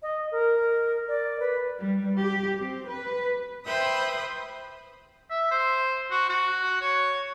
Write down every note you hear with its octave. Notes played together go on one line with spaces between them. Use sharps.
D#5
A#4
D5
B4
G3
G4
C4
B4
B4 C5 E5 G5 B5 D#6
E5
C5
F#4
F#4
C#5